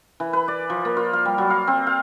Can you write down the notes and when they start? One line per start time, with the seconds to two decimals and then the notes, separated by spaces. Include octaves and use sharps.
0.20 E3
0.33 B4
0.48 D5
0.70 F3
0.85 A#3
0.97 F4
1.13 F5
1.25 G3
1.38 F#3
1.50 F5
1.67 C4
1.87 F5